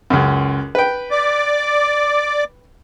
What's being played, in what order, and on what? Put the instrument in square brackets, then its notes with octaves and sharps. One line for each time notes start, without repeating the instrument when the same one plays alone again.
[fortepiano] C#2 F#2
B4 G5
[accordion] D5 D6